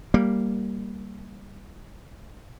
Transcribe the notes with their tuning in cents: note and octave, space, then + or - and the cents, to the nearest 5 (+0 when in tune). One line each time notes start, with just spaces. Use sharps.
G3 +0 A#3 +0